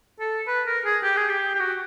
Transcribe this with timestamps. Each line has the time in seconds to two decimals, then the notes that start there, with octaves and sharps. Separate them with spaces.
0.20 A4
0.47 B4
0.66 A#4
0.85 G#4
1.03 G4
1.17 G#4
1.29 G4
1.55 G4
1.60 F#4